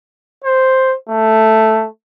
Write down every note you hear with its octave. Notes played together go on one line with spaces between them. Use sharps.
C5
A3